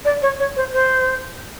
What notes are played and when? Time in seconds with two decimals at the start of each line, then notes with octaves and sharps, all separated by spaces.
0.05 D5
0.22 C#5
0.39 C#5
0.56 C5
0.73 C5